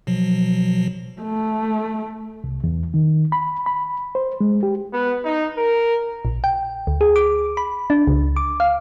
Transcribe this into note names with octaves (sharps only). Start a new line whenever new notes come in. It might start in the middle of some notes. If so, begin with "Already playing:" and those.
B2 F3 F#3
A3
C2
E2
D#3
B5
B5
C5
G#3
G4
B3
D#4
A#4
A#1
G5
D2
G#4
D6
B5
D4
C#2
D6
F5